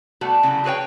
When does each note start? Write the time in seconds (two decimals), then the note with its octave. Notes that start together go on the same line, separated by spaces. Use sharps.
0.21 G3 A3 B3 F#4
0.43 C#3 E3 F#3
0.64 F#4 G#4 B4 C#5 G5